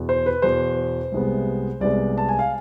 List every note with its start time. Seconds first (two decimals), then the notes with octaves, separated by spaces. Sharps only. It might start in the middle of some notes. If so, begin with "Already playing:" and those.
Already playing: E2 B2 B3
0.09 C5
0.26 B4
0.42 E2 B2 B3 C5
1.12 C2 C3 G#3 B3
1.81 C2 C3 G#3 B3 D5
2.18 A5
2.29 G#5
2.39 F5